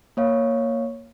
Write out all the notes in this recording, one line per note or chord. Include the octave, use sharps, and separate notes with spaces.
A#3 C#5 F5